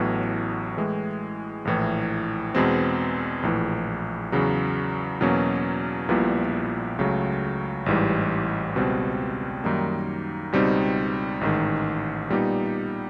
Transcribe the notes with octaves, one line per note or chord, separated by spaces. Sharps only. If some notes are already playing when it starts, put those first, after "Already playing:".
Already playing: A1 A2 F#3 B3
A2 E3 G#3
A#1 A2 E3
E2 B2 G#3 C4
A#1 A2 E3
E2 C#3 F#3
E2 B2 F#3 A#3 C#4
A#1 A#2 G3 B3 E4
C#2 C#3 F#3 A3
A1 G#2 E3 G3
C#2 B2 G3 C4
F#2 D#3 G3 A#3 D#4
C#2 B2 G3 C4 D#4
A1 G#2 D#3
A#2 G3 B3 D#4 G4